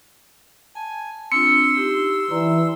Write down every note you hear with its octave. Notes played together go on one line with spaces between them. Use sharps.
G#5 A5
C4 D4 F4 C6 E6 C#7
D#4 G4
E3 D5 A#5